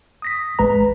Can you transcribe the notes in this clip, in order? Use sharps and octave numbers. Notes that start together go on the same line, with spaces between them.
D#6 A#6 B6
A1 G#3 B4 A#5